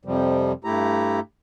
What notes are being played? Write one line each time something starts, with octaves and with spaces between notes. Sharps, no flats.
F2 C3 F3 G3
G2 A3 E4 G4 A#5